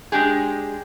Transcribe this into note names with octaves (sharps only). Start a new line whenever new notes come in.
G#3 D4 G4 G#4